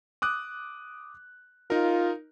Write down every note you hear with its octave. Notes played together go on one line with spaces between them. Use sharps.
D6 D#6 F#6
D#4 F4 A#4